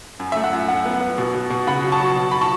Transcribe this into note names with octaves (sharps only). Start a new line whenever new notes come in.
F#2
E5
A3
F#5
F#2
F#2 F#5
B3
B3
B2
B2
B2
C#3 F#5 B5
F#3
A5 C#6
F#3
B2
B5
A5 C#6